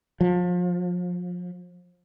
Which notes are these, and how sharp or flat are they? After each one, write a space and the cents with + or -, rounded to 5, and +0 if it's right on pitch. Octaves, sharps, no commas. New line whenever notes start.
F3 +30